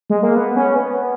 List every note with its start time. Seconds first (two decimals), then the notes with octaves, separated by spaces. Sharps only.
0.10 G#3
0.23 A#3
0.36 B3
0.56 C#4
0.76 B3